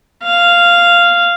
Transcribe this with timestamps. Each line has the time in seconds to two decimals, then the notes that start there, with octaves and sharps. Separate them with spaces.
0.23 F5